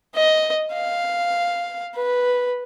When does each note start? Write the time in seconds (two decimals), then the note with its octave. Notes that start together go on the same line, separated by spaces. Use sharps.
0.15 D#5
0.73 F5
1.95 B4